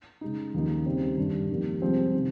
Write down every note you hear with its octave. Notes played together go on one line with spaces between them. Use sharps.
C#3 G#3 D#4
D#2 C#3 F3 A#3 D#4
C#3 G3 C4 D#4
G2 D#3 G3
F2 D#3 G3 A#3
C2 C3 F3 G#3 C4
C3 D#3